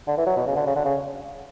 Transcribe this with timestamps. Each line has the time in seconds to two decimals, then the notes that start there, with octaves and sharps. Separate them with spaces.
0.08 D3
0.17 E3
0.26 F#3
0.37 B2
0.46 C#3
0.56 D3
0.66 C#3
0.76 D3
0.85 C#3